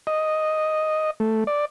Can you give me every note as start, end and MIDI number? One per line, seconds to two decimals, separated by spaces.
0.07 1.11 75
1.20 1.44 57
1.47 1.65 74